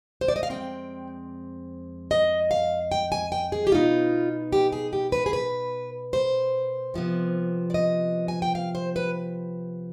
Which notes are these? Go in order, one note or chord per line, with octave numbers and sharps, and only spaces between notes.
C5
D5
D#5
F5
F2 D3 G#3 C4 G5
D#5
F5
G5
G#5
G5
G#4
G4
B2 B3 D#4 F4
G4
G#4
G4
B4
G#4
B4
C5
C3 F3 B3
D5
D#5
G#5
G5
F5
C5
B4